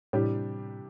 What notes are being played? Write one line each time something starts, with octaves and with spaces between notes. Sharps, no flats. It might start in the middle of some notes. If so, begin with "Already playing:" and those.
A2 C3 E3 G3 D4 G4